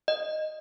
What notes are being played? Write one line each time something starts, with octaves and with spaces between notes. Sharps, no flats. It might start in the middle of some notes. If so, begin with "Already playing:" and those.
D#5